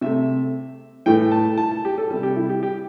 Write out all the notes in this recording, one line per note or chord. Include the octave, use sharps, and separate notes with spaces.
C3 A3 E5
A2 E3 A3 G5
A5
A5
A5
G4
A4
C3 G3 A4
G4
E4
G4
G4